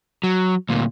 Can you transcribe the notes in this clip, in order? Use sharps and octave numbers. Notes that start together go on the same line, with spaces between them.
F#3
D2 A#2